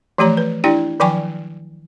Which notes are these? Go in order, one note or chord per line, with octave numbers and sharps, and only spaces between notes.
E3 F3 A3 G4 C#5 A#5
B4
D4 E4 G4 D5 G5
D#3 F3 F#3 G5 G#5 C#6